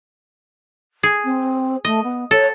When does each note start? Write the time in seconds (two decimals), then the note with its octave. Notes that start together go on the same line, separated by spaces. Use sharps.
1.03 G#4
1.24 C4
1.85 A3 D#5
2.03 B3
2.31 A4 C#5